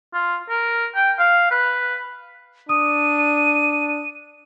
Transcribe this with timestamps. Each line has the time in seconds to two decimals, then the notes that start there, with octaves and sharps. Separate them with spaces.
0.14 F4
0.49 A#4
0.95 G5
1.19 F5
1.51 B4
2.69 D4 D#6 D#7